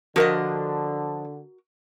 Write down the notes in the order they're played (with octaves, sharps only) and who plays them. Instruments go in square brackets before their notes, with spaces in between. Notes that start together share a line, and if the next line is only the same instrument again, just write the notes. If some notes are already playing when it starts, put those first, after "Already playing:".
[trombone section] D3 [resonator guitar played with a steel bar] F3 D4 D#5 [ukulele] F#4 A#4